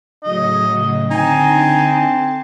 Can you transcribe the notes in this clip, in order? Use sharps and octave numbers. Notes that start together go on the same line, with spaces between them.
A2 C#3 F#3 D#5
D3 C4 D#4 G#5 A5